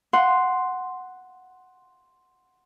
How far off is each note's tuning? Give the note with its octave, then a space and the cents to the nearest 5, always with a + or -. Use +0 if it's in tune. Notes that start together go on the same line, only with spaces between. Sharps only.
F#5 +0 C6 +0